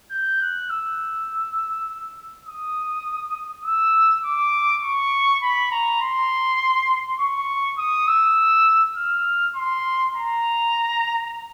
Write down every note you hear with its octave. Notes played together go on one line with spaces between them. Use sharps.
G6
F#6
E6
D#6
E6
D6
C#6
B5
A#5
C6
C#6
D#6
E6
F6
C6
A#5